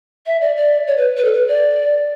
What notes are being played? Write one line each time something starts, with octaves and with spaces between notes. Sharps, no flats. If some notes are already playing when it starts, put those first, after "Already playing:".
E5
D5
D5
C#5
B4
B4
A4
B4
D5